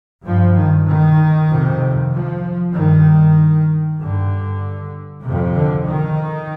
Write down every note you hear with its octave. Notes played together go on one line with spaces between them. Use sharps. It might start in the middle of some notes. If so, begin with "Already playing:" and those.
G2 F3
D#3
D#3
F2 C3
F3
G2 D#3
G2 D3
F2 C3
D3
D#3